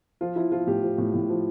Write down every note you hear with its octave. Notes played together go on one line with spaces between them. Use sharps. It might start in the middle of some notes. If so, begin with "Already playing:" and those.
F3 F4
F3 E4
F3 F4
A2 G4
F3
A2
A2
F3